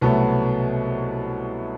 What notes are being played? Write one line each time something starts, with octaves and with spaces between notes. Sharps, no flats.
C2 B2 F#3 A3 B3